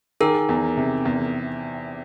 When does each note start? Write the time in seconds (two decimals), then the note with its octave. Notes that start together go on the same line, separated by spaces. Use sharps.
0.20 D#3 G#4 A#4
0.49 E2
0.77 C3
1.05 E2